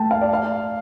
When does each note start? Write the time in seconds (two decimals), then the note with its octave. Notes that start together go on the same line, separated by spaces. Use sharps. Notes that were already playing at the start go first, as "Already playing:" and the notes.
Already playing: A3 G5 A5
0.11 F5
0.21 D5
0.33 F5